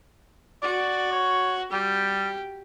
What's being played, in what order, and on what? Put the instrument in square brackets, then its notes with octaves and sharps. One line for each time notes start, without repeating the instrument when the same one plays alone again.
[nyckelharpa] F#4 [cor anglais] D5
[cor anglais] C#5
[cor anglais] G3 [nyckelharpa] G4